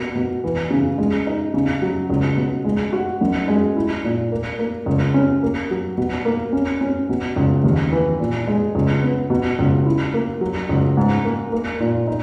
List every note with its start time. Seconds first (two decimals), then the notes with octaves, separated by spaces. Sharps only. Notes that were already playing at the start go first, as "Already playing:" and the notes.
Already playing: B2 A#3 D#4
0.15 B2
0.44 E3
0.71 C#3
0.98 G#3
1.27 D#4
1.54 C#3
1.82 F#3
2.10 C#2
2.37 B2
2.64 G#3
2.93 F#4
3.21 F#2
3.48 G#3
3.76 E4
4.04 A#2
4.32 A#3
4.59 A#3
4.86 C#2
5.14 C#4
5.43 A#3
5.71 F#3
5.97 B2
6.25 A#3
6.53 C#4
6.81 C#4
7.09 B2
7.36 C#2
7.64 D#2
7.92 E3
8.20 A#2
8.47 G#3
8.75 C#2
9.03 B3
9.30 B2
9.59 C#2
9.86 E4
10.14 A#3
10.41 F#3
10.69 C#2
10.97 G#2
11.25 A#3
11.52 A#3
11.80 A#2
12.08 D#4